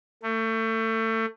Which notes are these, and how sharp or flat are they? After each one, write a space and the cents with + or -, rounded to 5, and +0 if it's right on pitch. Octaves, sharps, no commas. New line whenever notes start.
A3 +30